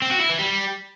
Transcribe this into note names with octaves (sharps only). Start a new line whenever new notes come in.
C4
F#4
E4
E3
G3